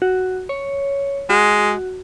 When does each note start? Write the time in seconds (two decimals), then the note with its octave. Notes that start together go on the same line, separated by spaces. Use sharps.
0.02 F#4
0.49 C#5
1.30 G#3 F#4